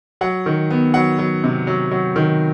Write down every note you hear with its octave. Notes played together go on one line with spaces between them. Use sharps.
F#3 F#5
D#3
B3
F#3 F#5
F#3
C3
F#3
F#3
D#3